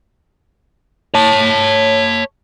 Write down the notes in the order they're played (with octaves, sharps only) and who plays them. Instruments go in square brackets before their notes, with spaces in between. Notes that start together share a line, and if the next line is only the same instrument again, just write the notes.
[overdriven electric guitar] C#5 A5